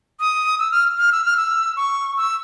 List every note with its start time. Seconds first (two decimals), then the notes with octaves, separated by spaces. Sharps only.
0.20 D#6
0.59 E6
0.71 F6
0.98 F6
1.12 E6
1.25 F6
1.37 E6
1.76 C#6
2.17 E6